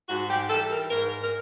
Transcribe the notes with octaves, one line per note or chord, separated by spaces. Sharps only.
G#2 F#4
G4
E3 G3 A4
A#4
G#2 A#4
A#4